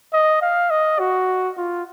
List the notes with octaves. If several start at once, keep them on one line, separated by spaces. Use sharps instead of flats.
D#5
F5
D#5
F#4
F4